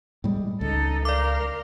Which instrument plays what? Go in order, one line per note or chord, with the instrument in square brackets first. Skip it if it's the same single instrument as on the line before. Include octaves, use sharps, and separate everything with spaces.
[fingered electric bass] A2 G3 G#3
[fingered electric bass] C#2 [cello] D#4 A4
[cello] A#4 F5 [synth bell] D5 D6